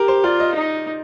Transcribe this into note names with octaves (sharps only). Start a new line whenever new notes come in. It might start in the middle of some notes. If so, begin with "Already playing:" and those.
Already playing: G4 A#4
C5
F4 D5
D#5
D#4